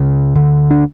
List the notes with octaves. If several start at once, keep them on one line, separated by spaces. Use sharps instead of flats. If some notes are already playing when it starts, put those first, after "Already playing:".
Already playing: C#2 C#3
D2 D3
D4